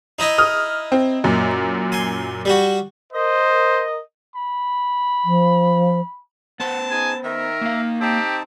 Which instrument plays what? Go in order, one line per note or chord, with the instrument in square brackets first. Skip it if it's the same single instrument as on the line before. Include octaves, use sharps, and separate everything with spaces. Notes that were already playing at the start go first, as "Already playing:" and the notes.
[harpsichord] D#4 E4 D#5
[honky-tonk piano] D#6 F6
C4
F#2 A#2
[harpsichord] G#5 C6
G3 F#4
[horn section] A#4 D#5 [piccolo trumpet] C5
[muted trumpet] B5
[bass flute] F3
[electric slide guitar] B3 C5 [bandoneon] F#5 [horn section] A5
[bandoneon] D#4 G#4 [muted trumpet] G#5
[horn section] D#3 [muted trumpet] A#4 [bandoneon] E5
[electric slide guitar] A#3 F5
[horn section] C4 [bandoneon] D#4 A5 [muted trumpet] G4